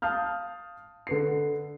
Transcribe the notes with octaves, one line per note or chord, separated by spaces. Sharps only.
F5 A5 D#6 F6 G6
D3 B4 C7